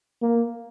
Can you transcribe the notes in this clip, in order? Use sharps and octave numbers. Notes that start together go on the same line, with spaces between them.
A#3